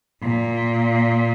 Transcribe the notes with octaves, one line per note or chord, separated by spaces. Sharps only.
A#2